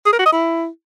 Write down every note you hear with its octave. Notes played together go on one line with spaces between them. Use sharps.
G#4
A#4
F#4
D#5
E4